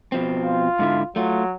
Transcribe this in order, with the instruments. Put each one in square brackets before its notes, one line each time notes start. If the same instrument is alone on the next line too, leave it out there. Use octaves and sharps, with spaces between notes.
[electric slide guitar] B2 F3 C4
[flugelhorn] F4
[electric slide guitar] G#2 D3 E4
[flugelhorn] F#3 [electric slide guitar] A3 F4